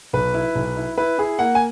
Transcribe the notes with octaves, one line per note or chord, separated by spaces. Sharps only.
B1 B4
E4
B1
E4
E4 B4
E4 G#4
A#3 F#5
G#5